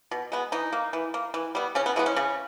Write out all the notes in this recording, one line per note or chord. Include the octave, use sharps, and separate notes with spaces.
B2
G#3 B3
E3 D#4
A#3
E3
A#3
E3
G3 B3
C#3 C#4
B3
E3 G#3 B3
C#4
C#3